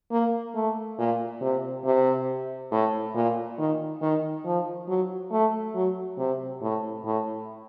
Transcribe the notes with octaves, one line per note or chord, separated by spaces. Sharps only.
A#3
A3
A#2
C3
C3
A2
A#2
D#3
D#3
F3
F#3
A3
F#3
C3
A2
A2